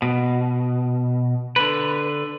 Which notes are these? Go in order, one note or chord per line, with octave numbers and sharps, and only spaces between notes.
B2
D3 B4